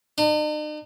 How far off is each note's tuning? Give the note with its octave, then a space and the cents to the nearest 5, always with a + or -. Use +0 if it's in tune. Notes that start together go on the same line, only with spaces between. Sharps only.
D#4 -45